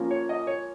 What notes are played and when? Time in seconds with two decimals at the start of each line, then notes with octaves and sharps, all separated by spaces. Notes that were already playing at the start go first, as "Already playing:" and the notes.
Already playing: F3 A#3 C#4 F4
0.11 C#5
0.29 D#5
0.47 C#5